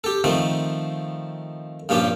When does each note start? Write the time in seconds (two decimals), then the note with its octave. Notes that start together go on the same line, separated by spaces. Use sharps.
0.04 G4 A4
0.24 D#3 F3 A3 C4
1.89 G2 A#2 F3 C#4 G4